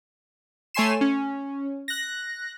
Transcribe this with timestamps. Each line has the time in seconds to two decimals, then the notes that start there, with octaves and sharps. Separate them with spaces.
0.74 A3 C#5 G#5 C6 C7 E7
1.01 C#4
1.88 F#6 A#6